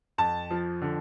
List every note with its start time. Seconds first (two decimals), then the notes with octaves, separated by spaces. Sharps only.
0.18 F2 A5
0.51 F3
0.82 D3